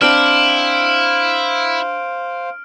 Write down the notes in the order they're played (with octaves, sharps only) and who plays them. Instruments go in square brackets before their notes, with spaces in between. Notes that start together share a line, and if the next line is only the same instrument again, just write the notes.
[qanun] C4 D4 [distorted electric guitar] E4 [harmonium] C5 F5 [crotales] F6 D7